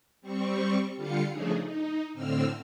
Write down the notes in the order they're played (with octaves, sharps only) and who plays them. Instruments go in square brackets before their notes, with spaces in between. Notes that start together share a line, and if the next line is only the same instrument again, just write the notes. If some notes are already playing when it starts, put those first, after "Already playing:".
[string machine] G3 C4 C#6
D3 G3 F4 F5 C#7
C#3 F3 A3 D4 D#4 G#4
D#4
A2 D3 C4 E6 F6